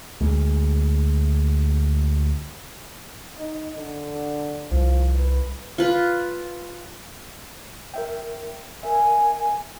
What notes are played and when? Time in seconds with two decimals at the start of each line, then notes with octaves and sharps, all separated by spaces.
0.21 D2 G#3
3.38 D#4
3.77 D3
4.71 C2 F3
5.15 B4
5.78 F4 B4
7.94 A#4 E5 G5
8.83 A#4 E5 G#5